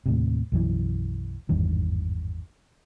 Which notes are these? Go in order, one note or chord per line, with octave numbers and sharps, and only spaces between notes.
D#2 A2 C3
B1 F#2 E3
G#1 E2 G2 D#3